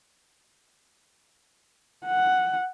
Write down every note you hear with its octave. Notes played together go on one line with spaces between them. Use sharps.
F#5